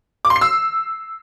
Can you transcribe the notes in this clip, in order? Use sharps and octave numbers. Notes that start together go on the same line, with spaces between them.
D6
C6
C7
E6